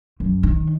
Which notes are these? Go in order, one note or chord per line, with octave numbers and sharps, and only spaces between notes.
F#2
D#3